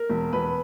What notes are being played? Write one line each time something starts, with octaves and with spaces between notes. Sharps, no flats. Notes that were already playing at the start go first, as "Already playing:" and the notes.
Already playing: A#4
E1
E1 B4